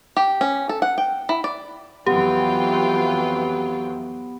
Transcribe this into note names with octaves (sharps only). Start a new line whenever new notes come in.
G4
C#4
A4
F#5
G5
E4
D5
F2 E3 F#3 B3 F4 G4 G5